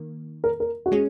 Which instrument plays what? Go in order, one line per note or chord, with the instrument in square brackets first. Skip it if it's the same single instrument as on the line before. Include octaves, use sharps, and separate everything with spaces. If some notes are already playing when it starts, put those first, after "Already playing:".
Already playing: [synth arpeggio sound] D#3 A#3
[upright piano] A#4
A#4
F#4
[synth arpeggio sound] G#3 C#4 [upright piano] G#4